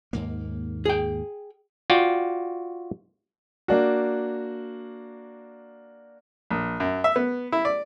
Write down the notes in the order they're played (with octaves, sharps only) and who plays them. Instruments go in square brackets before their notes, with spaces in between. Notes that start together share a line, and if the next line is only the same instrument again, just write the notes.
[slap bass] D#2 G#2 A#3
[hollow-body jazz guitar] G#4 G5
[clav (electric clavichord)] F4 F#4 D5 G5
[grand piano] A#3 D4 F#4
[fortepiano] A#1
F#2
E5
B3
E4
D5